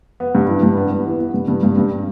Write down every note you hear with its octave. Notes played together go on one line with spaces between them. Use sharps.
B3
G2
E3
G2
B3
B3
E3
B3
G2
G2
G2
G2